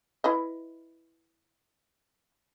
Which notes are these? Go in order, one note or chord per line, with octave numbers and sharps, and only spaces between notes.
E4 B4 D#5